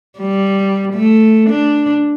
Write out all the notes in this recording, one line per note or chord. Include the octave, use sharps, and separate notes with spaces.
G3
A3
D4